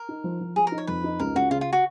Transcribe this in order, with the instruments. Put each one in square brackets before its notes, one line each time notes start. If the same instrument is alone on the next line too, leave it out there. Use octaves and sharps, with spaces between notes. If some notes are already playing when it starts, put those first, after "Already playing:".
Already playing: [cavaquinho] A#4
[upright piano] D#4
F3
F3
[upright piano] F3 [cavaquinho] G#4
[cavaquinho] A#4
[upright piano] D#4
[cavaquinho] C#5
[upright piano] F2 [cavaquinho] B4
[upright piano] D#4
[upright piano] C#2 [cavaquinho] A#4
[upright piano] C#2 [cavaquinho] F#4
[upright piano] C#3 [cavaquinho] F4
[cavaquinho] F4
F#4